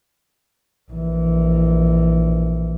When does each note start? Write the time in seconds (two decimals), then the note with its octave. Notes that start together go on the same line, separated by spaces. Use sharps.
0.92 A#1 E3